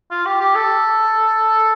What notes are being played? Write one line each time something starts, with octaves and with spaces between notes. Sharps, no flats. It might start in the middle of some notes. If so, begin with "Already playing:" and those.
F4
G4
G4
A4